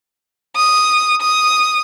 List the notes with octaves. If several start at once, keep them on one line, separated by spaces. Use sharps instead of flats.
D#6
D#6